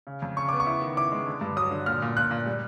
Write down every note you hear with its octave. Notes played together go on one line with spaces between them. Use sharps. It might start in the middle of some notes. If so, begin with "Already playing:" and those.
C#3
F2
C#3 C#6
B3 D6
C#6
E4
D#3
E4 D6
G#3
D3
G2
F#3 D#6
D3
A#2 F6
A#2
A#2 F#6
A#2
G3